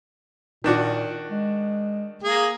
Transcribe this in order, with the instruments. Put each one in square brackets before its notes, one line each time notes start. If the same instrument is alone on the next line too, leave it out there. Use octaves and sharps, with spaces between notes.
[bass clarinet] A#2 [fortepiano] D#3 D4 F#4
[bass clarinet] G#3
[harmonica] A#3 G#4